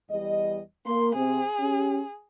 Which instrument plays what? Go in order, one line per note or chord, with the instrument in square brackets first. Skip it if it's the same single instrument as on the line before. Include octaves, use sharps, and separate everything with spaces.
[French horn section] E2 G3 D#5
[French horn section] A#3 [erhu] C6
[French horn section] C3 C4 [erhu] G#4
[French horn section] C#4 G4